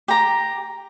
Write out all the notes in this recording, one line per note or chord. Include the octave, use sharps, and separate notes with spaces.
G4 A#5